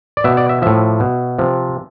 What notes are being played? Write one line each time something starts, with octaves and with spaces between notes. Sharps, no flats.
D5
B2 E5
D5
E5
A2 F3 E5
B2
C3 F3